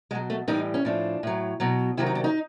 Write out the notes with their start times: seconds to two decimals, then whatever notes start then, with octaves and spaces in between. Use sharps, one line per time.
0.11 B2 F#3 G#3
0.30 A3
0.48 A2 E3 G3 D#4
0.74 C#4
0.85 A2 F3 D4
1.23 A2 F#3
1.60 B2 F#3
1.97 C3 D#3 F#3 E4
2.06 D#4
2.15 D4
2.24 D#4